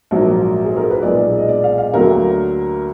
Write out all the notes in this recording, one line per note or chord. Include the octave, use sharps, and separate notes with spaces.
A#1 G#2 F#3 A#3
G#4
A#4
B4
B1 A#2 G#3 D5
D#5
D5
F5
F5
D2 D3 F#3 A#3 A#4